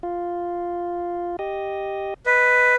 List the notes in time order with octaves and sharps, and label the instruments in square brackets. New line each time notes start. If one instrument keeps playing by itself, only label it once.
[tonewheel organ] F4
G4 D#5
[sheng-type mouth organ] B4 [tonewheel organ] D#5